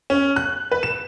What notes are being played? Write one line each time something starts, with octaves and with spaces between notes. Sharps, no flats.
C#4
F#6
B4
E7